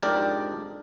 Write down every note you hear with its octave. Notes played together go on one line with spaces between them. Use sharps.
F2 G#2 D4 G4 A#4 D5